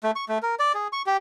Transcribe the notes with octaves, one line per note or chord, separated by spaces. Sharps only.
A3
C#6
A3
A#4
D5
G#4
C#6
G4